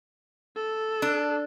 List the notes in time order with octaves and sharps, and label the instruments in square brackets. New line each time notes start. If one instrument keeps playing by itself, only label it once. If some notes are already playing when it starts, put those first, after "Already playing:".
[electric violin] A4
[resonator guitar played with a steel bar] D4